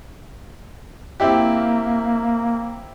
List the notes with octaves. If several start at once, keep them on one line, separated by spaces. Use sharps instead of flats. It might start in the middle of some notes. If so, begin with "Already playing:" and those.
A#3 C4 E4 G4